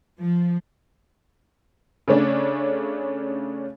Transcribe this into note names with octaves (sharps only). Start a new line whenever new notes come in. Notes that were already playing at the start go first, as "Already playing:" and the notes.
F3
C#3 A3 C#4 D4